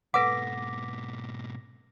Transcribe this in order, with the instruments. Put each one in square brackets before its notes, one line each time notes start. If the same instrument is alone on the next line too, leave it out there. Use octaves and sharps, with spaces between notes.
[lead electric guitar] G#2 B2 [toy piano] A4 B4 F#5 [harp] D6 [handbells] A#6 B6